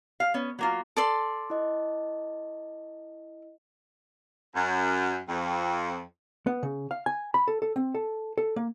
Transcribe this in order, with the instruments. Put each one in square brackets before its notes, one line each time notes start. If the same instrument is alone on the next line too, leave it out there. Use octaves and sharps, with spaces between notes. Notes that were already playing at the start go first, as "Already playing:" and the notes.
[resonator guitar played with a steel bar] F5
B3 C#4
F#3 A#3 F4
[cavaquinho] A4 D5 C6
[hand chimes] E4 D#5
[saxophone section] F#2
F2
[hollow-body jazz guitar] B3
C#3
F5
G#5
B5
A4
A4
C4
A4
A4
A#3